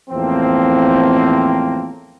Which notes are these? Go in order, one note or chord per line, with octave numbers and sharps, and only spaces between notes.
E2 A2 F3 A#3 C4